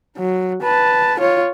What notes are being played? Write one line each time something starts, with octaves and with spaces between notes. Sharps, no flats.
F#3
B4 A5
F4 C#5